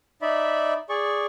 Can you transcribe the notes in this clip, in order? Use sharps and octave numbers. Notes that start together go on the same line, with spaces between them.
D#4 D5 E5 B5
G#4 D5 C#6